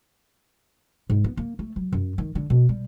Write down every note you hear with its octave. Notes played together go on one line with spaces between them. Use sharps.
G#2
B3
A#3
A3
F#3
F#2
D#3
D3
B2
G3